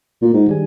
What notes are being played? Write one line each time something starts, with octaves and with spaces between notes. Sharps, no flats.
A#2
G#2
D#3 G3 D4 G#4